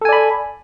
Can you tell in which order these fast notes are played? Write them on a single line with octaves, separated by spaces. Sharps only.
A4 G#5 D5 B5